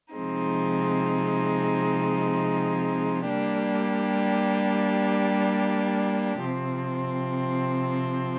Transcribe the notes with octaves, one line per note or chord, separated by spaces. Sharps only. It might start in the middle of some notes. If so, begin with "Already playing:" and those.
C3 F3 G#3 C4 D#4
G3 A#3 D4 G4
C3 F3 C4